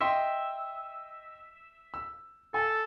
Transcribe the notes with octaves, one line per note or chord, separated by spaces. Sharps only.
D#5 E5 G5 C6
E6
A4 G#5